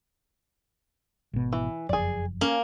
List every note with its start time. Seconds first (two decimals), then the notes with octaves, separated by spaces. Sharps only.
1.33 G#1 B2
1.52 E3
1.89 F#1 F2 G#4 D5
2.41 A#3 C#4